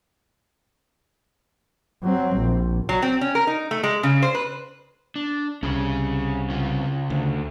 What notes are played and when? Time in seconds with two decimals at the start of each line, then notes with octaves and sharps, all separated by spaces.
2.04 F#3 C4
2.37 A#1
2.89 F#3
3.02 C4
3.21 C#4
3.35 A#4
3.47 D#4
3.71 A3
3.83 G#3
4.03 C#3
4.22 C5
4.35 B4
5.16 D4
5.63 C2 C#4 G#4
6.50 C#3 C#4 F4
7.10 D2